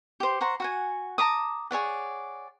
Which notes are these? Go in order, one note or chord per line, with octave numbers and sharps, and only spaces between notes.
G4 C5
C5 F#5 A#5 C#6
F#4 F#5 G#5
A5 A#5 D6 D#6
G#4 C#5 D5 F#5